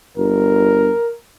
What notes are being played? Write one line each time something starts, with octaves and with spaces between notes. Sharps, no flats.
G1 A#4